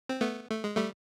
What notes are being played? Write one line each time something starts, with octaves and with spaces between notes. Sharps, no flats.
C4
A3 B3
A3
G#3
G3 A3